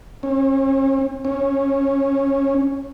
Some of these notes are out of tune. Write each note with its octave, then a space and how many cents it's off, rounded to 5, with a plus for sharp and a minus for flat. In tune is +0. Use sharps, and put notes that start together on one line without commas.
C#4 -40
C#4 -15